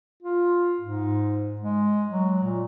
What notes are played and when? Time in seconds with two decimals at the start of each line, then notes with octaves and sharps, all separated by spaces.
0.23 F4
0.80 G#2
1.61 G#3
2.09 F#3
2.43 A#2